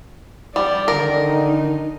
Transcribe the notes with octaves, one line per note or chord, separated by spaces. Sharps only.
G3 D5
D3 D#3 A#4
D#4